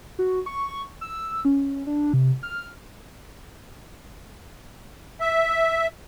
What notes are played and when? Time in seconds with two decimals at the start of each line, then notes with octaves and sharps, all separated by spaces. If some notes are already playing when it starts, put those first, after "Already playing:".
0.19 F#4
0.46 C#6
1.01 E6
1.45 C#4
1.87 D4
2.13 C3
2.43 F6
5.21 E5